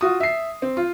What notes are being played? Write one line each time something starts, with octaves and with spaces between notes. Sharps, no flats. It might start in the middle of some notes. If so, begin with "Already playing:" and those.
F4 F#4 D#6
E5 C7
C4
F4